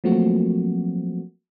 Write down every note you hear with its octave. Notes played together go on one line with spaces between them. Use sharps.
F3 F#3 A3 A#3 C4 F#4